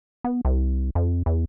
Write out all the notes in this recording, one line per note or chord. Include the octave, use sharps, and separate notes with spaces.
B3
C2
F2
E2